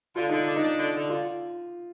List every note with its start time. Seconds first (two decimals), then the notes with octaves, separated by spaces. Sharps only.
0.16 D3 F4
0.29 D3 D#4
0.46 D4
0.56 D#4
0.62 D4
0.78 D3
0.94 D3
1.09 F4